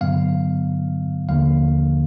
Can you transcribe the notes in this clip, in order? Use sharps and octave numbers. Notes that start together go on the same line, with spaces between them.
G2 D3 F#3 B3 F5
D#2 D3 F3 A#3 F5